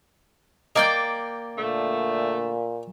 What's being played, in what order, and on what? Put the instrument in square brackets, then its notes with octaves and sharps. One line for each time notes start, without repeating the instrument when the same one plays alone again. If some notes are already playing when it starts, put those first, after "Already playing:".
[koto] A#3 D5 G5 [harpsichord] D#5 G#5
[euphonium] A#2 [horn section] D3 F3 A3